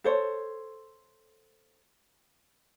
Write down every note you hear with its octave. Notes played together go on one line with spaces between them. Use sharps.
A4 C5 C#5